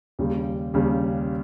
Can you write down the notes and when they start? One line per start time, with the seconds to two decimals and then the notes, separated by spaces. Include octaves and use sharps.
0.19 D#2 C#3 G3
0.74 D#2 C#3 G3